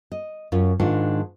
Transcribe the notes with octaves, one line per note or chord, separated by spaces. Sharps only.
D#5
F#2 C#4 F4
G#2 D#3 G#3 D4 F4 F#5